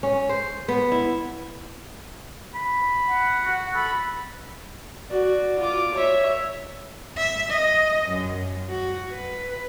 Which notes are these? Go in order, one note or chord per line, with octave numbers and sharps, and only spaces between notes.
C#4
C5
B3
E4
B5
F#5
F#4
A4 B5
F#4 D5
F4 D6
C#5 E5
E5
D#5
F#2
F#4
B4